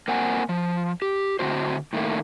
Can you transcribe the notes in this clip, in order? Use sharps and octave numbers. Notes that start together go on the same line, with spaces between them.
A#3 C4 F#5 G#5
F3
G4
A2 D3 C4 F#4 C5
A2 D#3 A3 A#3